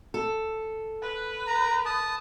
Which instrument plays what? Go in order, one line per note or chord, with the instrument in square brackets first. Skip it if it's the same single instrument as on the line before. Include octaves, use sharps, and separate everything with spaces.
[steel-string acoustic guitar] A4
[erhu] B4
[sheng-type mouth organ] A#5
A5 D#6